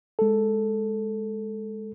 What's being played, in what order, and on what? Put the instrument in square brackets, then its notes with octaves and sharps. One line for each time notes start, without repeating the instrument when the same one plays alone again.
[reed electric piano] G#3 A4